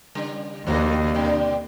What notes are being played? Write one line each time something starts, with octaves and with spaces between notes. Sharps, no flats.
C#3 G3
D#2 D3 A3 F#4
G2 B2 D3